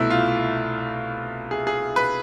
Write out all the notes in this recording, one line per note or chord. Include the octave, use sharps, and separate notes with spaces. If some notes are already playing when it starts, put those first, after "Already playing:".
Already playing: C2 B2 A3 E4
F4
G#4
G#4
B4